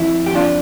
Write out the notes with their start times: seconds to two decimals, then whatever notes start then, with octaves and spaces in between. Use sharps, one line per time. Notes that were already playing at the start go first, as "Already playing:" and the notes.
Already playing: F2 E4
0.26 G4
0.35 F2 D4 F4